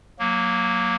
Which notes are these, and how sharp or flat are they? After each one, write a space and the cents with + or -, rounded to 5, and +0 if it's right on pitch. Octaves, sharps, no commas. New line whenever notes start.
F#3 -15 A#3 +0